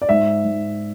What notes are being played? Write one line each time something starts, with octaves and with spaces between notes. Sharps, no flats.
D5
G#2 E5
G#2